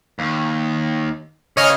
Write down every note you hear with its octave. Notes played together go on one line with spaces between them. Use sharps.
D#2
C#3 G#4 C#5 D#5 F6